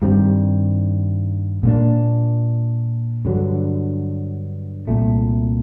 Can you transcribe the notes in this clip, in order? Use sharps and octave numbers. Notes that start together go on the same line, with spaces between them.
G2 D#3 G3 C4
A#2 G3 A#3 D4
G2 D3 F#3
C2 A#2 A3